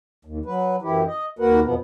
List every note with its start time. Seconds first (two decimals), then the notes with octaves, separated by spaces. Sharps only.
0.25 D#2
0.45 F#3 B4
0.82 F#2 E3 E4 G4
1.06 D#5
1.39 D#2 A#3 F#4 A#4 B4 F#5
1.63 F2 B2 F3 B3